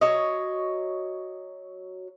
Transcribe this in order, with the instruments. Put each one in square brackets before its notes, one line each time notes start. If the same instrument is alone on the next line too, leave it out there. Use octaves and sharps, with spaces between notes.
[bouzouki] F#3 C#5 D#5